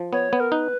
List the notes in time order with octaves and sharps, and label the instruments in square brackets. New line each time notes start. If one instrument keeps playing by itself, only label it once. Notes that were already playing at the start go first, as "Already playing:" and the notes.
Already playing: [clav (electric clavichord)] F3
[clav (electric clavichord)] B3 [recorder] C#5
[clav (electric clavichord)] B3
[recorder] A#4
[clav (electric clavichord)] D#4 [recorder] B4